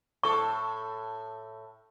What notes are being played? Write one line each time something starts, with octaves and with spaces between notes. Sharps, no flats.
A2 A4 C#6